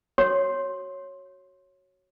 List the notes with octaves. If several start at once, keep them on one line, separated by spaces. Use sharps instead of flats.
F#4 C#5 C6